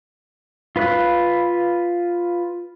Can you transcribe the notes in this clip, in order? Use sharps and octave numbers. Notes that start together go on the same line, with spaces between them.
F4 B4 F5 F#6